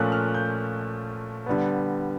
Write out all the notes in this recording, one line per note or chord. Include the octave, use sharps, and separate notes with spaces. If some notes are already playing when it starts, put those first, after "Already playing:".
Already playing: A#2 F3 A3 C#4 F#6
F6
G6
D3 G3 B3